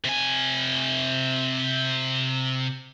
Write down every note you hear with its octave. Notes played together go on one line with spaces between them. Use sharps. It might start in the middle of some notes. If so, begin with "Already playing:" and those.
C3 G#5